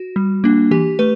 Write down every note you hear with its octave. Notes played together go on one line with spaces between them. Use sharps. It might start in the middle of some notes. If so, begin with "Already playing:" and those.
Already playing: F#4
G3
A#3 D4
E3 G4
A3 B4